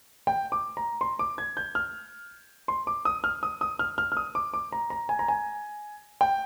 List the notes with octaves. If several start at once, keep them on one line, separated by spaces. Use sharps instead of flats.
G5
D6
A#5
C6
D6
G#6
G6
F6
C6
D6
D#6
F6
D#6
D#6
F6
F6
F6
D#6
D6
D6
A#5
A#5
G#5
A#5
G#5
G5